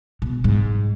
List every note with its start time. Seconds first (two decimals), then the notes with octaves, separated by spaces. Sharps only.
0.22 B2
0.44 G#2